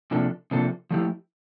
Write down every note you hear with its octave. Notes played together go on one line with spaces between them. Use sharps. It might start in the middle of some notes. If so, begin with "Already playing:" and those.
C3 F3 A#3 D4 A4
C3 F3 A#3 D4 A4
F3 A3 E4 G4